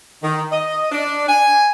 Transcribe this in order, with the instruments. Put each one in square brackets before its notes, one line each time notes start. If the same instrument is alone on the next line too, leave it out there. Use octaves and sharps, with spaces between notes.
[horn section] D#3
D#5
D4
G#5